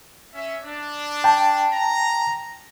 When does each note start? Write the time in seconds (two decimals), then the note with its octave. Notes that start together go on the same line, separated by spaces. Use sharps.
0.35 C#4 E5
0.64 D4
1.24 G5 A5
1.73 A#5